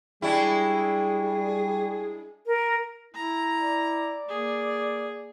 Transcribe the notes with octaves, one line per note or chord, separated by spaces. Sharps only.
G3 G#3 D4 E4 G#4 G5 C#6
A#4
E4 A#5
D5
A#3 G#4